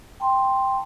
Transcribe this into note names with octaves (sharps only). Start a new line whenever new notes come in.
G5 A5 C6